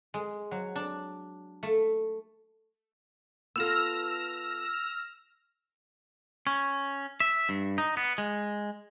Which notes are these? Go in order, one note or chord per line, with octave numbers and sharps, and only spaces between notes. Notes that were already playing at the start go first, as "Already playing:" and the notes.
G#3
F#3
D4
A3
B3 F4 A4 E6 F6 A#6
C#4
E5
G2
D#4
B3
G#3